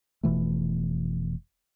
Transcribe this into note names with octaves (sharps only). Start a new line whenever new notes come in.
F1 B2 E3 A3